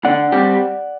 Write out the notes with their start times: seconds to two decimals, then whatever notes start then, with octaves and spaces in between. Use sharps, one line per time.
0.04 D3 D5 F#5
0.32 G3 C4 G4